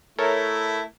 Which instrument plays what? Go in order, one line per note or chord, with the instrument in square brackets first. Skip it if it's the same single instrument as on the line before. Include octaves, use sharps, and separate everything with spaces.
[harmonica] A3 E4 [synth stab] A4 A#4 C#5